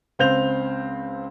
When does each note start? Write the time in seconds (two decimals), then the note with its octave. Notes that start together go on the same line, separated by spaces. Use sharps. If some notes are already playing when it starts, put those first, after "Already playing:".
0.19 C#2 C4 F5 G6 F7